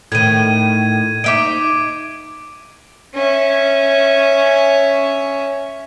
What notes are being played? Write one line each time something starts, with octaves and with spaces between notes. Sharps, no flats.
A2 D#3 G#6 D#7
D#4 E5 D6 D7
C#4 E5